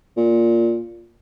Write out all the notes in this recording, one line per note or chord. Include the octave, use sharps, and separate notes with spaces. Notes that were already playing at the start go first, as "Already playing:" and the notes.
A#2